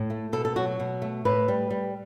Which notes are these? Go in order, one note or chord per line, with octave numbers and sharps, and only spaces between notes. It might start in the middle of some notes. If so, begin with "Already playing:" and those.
Already playing: A2
A3
B2 A4
A4
F#3 F#4
B2
A3
A2 B4
G3
G3